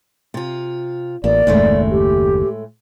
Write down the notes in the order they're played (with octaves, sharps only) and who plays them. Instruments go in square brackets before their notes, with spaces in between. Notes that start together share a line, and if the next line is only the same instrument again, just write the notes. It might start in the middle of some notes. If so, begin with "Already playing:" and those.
[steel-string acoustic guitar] C3 F4
[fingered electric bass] A1 [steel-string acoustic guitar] A#3 [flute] D5
[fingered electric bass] F#1 D#2 [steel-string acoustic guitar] A2 G#3 A3
[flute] G4